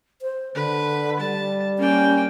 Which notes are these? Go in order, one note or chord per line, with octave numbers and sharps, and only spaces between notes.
C5
D3 B4
G3 A5
A#3 C#4 G5